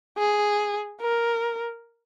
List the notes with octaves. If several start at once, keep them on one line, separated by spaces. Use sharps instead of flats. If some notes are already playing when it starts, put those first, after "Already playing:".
G#4
A#4